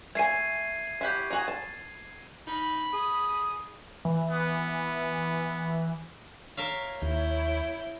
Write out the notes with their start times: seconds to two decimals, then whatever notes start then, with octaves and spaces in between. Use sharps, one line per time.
0.15 A3 G#5 G#6 C7 D#7
1.01 E4 F#4 G4
1.30 D#4 F#4 G#5
1.48 A5
2.47 D#4 B5
2.93 G#4 D#6
4.05 E3
4.31 B3
6.57 A#4 C#5 E5 F5
7.02 D#2 E4 G6